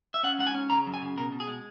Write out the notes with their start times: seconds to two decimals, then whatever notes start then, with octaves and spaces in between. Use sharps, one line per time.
0.14 E5
0.23 C#4 F#5
0.39 G#2 F#5
0.47 G#5
0.55 C#4
0.70 C#3 A#5
0.86 F#2
0.94 G#5
1.02 C#3
1.17 B2 A#4
1.32 B2
1.40 G#4
1.47 G#3